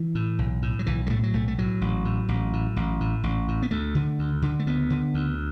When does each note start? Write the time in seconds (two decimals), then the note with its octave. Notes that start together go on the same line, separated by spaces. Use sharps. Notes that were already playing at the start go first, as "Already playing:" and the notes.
Already playing: E3
0.15 A2
0.39 B1
0.62 A2
0.79 F#3
0.86 B1 E3
1.06 F#3
1.10 A2 A3
1.23 F#3
1.33 B1 A3
1.48 A3
1.58 A2 F#3
1.81 A1
2.05 A2
2.29 A1
2.53 A2
2.76 A1
3.00 A2
3.23 A1
3.48 A2
3.62 B3
3.71 D2 A3
3.95 D3
4.19 D2
4.42 D3
4.59 A3
4.66 D2 B3
4.90 D3
5.14 D2